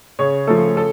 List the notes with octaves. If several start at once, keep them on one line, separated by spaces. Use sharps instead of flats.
C#3 C#5
F3 A3 A4
A4